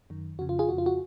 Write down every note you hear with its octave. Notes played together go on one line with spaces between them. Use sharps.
F#2 D#3
F2 C#3 F#4
F4
F4 G#4
F2 C#3 F#4
F4
F#4